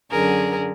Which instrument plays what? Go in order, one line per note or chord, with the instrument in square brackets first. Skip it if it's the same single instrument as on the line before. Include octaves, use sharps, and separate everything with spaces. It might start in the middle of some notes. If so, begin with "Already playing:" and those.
[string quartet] F#2 D3 G#4 A#4